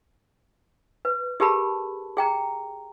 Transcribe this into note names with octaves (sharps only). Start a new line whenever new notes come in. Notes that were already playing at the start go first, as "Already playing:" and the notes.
B4
G4 G#4 A#4 A5 B5
G#4 G5 A#5